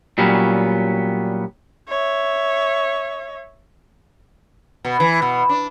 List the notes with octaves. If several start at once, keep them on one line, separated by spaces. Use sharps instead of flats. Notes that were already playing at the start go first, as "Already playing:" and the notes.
A#2 F#3 G3 B3 C#4
C#5 E5
B2
E3
B2
D4